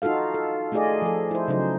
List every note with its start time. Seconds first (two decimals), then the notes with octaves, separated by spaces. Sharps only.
0.02 D#4 F4 F#4 A4 F5
0.34 A4
0.72 A3 D#4 F4 G#4 D5 D#5
1.02 F3 A4
1.31 E4 C5
1.48 C#3 F3 F#3 D#4 C5